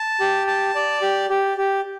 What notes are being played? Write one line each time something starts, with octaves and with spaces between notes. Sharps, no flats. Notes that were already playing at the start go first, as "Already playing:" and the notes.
Already playing: A5
G4
A5
D5
G4
G4
G4